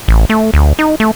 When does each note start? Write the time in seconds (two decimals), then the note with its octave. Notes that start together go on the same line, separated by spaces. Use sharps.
0.08 A1
0.30 A3
0.54 D2
0.79 D#4
1.00 A3